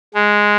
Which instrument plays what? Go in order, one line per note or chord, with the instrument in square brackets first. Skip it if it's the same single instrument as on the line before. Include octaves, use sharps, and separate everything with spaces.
[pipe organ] G#3